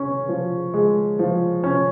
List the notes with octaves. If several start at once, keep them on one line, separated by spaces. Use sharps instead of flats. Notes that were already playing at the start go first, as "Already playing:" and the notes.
Already playing: C#4
F3
G#3
F3
C#4